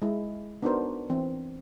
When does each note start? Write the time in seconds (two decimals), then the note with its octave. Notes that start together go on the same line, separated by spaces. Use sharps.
0.02 G#3 E4
0.62 B3 D4 D#4 F#4 A#4 C5
1.10 E3 C4